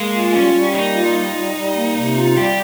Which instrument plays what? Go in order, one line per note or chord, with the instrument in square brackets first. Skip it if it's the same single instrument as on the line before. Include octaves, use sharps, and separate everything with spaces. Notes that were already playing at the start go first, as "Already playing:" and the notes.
Already playing: [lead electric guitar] G#3 [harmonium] A#3
[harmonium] F4
[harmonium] G3 [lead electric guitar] C#4
[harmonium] G3
[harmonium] A#3 [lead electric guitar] D#4
[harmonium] F4
G3
G3
G3
A#3
C3
F4
[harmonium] G3 [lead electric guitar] G4